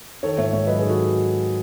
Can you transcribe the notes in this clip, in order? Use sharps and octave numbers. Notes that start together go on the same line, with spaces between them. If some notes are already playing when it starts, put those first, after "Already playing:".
D#3 A4 C#5
G#2 C#5 E5
G#2 C#5 E5
F#3 B4 D#5
D#3 G#4 B4
F#4 A4